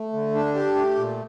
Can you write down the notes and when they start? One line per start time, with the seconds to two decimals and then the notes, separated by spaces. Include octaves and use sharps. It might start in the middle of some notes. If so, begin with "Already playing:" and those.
Already playing: A3
0.13 D3
0.35 D4
0.55 G4
0.75 A3
0.96 A#2